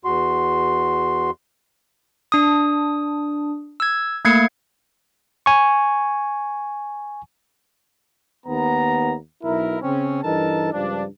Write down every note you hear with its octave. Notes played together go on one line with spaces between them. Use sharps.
E2 F#4 C6
D4 D#6
E6 G#6
A3 A#3 G#6 C7 C#7
G#5 C#6
D#2 B3 A#5
B1 E4 A#4
C#3 C4 C#4
G2 E3 D#4 A4 A#4 A5
C#2 G2 F3 D4